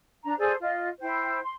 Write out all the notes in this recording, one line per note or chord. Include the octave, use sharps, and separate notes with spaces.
D4 A#5
G#4 A4 C5 D5
F4 D#5
E4 C5 G5
C6